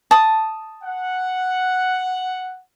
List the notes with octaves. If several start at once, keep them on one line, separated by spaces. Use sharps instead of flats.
A5 D#6
F#5